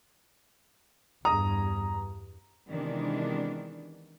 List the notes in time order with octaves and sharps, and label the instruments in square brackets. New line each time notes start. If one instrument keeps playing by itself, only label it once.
[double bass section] E2 G2 [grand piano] A#5 D#6
[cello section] C3 D#3 E3 G#3 B3 D4